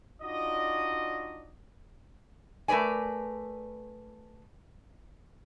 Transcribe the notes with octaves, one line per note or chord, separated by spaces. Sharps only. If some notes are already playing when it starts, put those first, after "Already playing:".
D4 D#4 F4 F#4 D5 D#5
A3 A#4 B4 D5 G#5